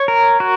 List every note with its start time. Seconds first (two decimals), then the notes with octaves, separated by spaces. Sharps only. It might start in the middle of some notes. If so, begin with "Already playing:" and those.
Already playing: C#5
0.08 A#4
0.40 F#4